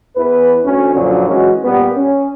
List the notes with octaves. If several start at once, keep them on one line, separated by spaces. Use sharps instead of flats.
E2 E3 B4
D2 C#4
F#2 A#2 D3 F3 F#3
E3 G#3 C#4 F#4
A#2 G3 B3
C#4